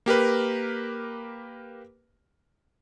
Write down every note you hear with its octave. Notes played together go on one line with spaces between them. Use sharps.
A#3 G4 A#4 B4